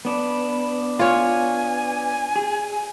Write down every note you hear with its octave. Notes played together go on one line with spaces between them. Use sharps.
B3 D4 B5
F4 C#5 G#5
G#4